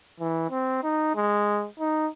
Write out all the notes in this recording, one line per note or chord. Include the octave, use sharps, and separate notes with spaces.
E3
C4
D#4
G#3
D#4